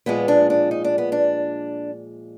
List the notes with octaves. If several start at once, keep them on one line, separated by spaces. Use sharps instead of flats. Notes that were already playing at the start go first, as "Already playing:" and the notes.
A#2 F3 G#3 B3
D4
D4
D#4
D4
B3
D4